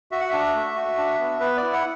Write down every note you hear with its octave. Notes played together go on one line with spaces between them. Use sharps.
F#4 E5
F#5
D4 E5
A3
F#4
D4
B3
B3 B4
D5
E4
F#5